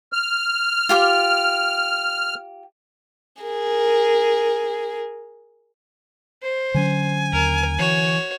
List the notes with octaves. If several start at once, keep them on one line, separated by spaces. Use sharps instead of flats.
F6
F4 G4 D6
G#4 A#4
C5
D3 F#3 C#4 G#5
D#2 A#4
E3 F#4 C#5